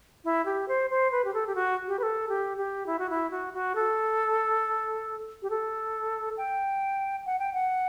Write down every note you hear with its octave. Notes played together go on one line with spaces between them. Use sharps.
E4
G4
C5
C5
B4
G4
A4
G4
F#4
G4
B4
A4
G4
G4
E4
F#4
E4
F#4
F#4
A4
G4
A4
G5
F#5
G5
F#5